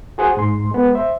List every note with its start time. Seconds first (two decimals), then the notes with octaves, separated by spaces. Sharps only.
0.18 F#4 G#4 C5 F#5 D#6
0.37 G#2 C6
0.71 G#3 B3
0.95 C5 E5